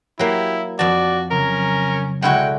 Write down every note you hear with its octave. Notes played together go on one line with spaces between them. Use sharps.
F#3 A#3 E4 G4
F2 F#4 D5 A5
C#3 F#3 C#4 A#4 A#5
B1 D3 G#3 A3 E4 F#4 F#5 G5